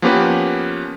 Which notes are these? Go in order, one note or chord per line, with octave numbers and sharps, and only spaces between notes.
F3 A#3 B3 C#4 G4 B4